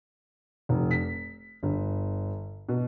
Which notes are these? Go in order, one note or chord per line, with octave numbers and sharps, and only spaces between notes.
F1
B6
G1
B2